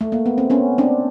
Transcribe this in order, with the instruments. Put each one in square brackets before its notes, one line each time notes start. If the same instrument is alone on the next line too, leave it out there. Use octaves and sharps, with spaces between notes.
[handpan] A3
A#3
B3
C4
B3 C#4
C4 D4